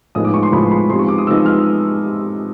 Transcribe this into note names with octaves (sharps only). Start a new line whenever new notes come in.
A2 F3 G#3 B3 D#4 D#6
D6
C#6
C6
A2 F3 G#3 B3 D#4 B5
B5
C3 F3 G#3 B3 D#4 C6
C#6
D6
D#6
C3 F3 G#3 B3 D#4 E6
F6